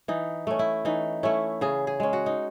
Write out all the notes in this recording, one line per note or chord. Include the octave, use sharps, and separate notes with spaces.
E3 D#4
A3 C#4
E4
E3 D#4
A3 C#4 E4
C#3 G#4
G#4
G#3 C#4
F#4
D#4